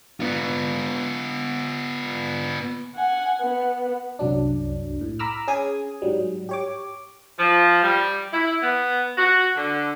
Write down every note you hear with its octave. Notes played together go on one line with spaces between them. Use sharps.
B3 F4
F#5 G#5
B3
C2 F#2 F#3 D4
A2
A#5 B5 D6 E6 F6
C#4 G#4 G#5 D#6
G#2 F#3 G3
G4 C#5 D6
F3
G3
E4
B3
F#4
D3